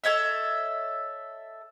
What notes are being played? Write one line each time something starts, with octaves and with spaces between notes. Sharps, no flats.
A4 C#5 D#5 E5